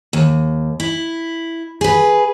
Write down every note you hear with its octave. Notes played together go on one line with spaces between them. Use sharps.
D#2
E4
G#4 B4